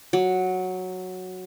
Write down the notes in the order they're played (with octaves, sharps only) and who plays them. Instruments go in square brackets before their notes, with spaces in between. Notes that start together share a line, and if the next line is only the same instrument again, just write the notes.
[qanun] F#3